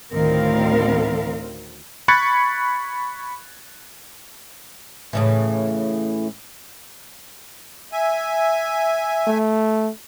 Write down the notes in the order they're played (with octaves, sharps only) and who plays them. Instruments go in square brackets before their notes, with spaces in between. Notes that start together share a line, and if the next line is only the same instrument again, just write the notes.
[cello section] D2 A2 D#3 C4 A#4 F5
[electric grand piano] B5 C#6 F#6 G#6 A6 C#7
[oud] A2 C#3 E3
[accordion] E5 G#5
[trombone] A3